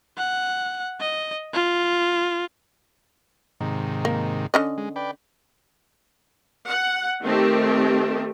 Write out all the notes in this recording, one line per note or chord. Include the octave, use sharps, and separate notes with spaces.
F#5
D#5
F4
G#2 C3 D#3
A#3
D3 C#4 D#5
G#3
B4 D5 G5
F#5
D#3 A3 C4 G4